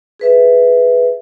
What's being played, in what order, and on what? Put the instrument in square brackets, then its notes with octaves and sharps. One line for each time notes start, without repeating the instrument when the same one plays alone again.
[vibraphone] G#4 B4 E5